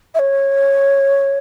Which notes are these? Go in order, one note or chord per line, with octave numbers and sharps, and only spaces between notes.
E5
C#5